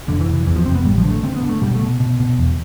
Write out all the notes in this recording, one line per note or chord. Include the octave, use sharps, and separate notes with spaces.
F1 D3
E3
F1
E3
E2 E3
F3
F1 C4
B3
A1 G3
F3
D3
A3
D3 C4
B3
D3
A3
B2 G3
A3
B2
B2
B2
E2